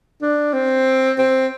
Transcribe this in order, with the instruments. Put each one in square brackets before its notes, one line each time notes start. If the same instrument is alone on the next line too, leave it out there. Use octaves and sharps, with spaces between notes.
[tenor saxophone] D4
C4
C4